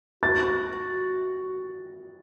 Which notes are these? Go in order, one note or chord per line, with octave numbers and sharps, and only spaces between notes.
F#4 A6